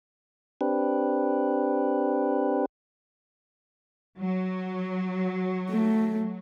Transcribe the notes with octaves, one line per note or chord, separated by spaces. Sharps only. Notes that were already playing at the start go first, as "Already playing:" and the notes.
C4 D4 G4 B4
F#3
A3